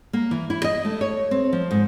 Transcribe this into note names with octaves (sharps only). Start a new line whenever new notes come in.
A#3
E3
E4
D#5
A3
C#5
C4
F3
G#2